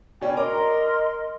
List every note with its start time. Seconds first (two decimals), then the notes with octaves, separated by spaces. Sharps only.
0.21 B2 C#4 D4 G5 G#5
0.37 A#4 D#5 A#5 C6 D6